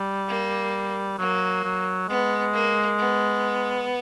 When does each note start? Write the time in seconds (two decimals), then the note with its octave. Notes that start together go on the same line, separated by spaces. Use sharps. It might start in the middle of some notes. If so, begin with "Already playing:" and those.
Already playing: G3
0.28 A#3
1.19 F#3 A#3
1.64 F#3
2.08 G#3 B3
2.53 A#3
2.99 B3